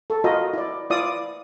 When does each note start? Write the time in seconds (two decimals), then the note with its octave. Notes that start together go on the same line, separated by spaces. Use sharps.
0.10 A4
0.24 F4 F#4 A#4 D#5
0.53 E4 D5
0.90 E4 F4 D5 D#6